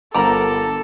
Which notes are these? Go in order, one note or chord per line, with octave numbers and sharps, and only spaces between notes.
G1 F3 A4 A#4 A#5 B5 D6